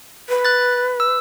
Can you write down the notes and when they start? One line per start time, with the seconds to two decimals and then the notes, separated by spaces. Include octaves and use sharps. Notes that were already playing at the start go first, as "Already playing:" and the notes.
0.29 B4
0.45 F#6 A6
1.00 E6